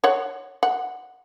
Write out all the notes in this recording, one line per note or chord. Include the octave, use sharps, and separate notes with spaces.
C#5 F#5
F#5